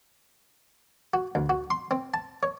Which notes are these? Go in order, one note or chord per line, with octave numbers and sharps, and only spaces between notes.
F#4
D2
F#4
C6
C4
A5
C#5